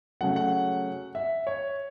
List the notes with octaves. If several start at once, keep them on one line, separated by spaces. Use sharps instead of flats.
C#3 F#3 A3 F#5
F#5
E5
C#5